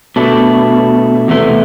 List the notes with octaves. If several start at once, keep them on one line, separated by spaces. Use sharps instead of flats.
B2 A3 D4
E2 C3 E3 A3